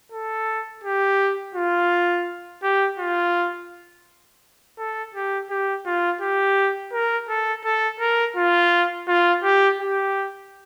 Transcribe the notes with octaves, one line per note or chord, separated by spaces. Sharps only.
A4
G4
F4
G4
F4
A4
G4
G4
F4
G4
A#4
A4
A4
A#4
F4
F4
G4
G4